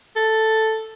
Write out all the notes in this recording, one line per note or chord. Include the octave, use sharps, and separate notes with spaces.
A4